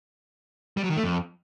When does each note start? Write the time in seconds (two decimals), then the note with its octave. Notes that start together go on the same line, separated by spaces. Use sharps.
0.77 G3
0.84 F#3
0.90 D#3
0.97 A3
1.04 F2